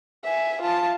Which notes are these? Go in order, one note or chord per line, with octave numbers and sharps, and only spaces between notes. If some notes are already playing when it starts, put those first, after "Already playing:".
E5 G#5
F4 A5